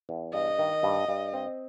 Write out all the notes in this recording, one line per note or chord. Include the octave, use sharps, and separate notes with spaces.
E2
G2 D#5
D#3
G2
G2
C4